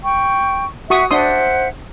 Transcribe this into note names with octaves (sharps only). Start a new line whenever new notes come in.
G5 C#6
F#4 E5 F#5 C#6 D#6
D4 C5 E5 F#5 C6 D#6